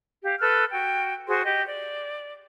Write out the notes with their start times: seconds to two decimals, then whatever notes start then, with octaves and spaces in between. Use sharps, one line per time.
0.22 G4 F5
0.39 A4 B4 F6 F#6
0.71 F#4 G5
1.28 F#4 G#4 C5 C6
1.44 G4 D#5 G5
1.66 D5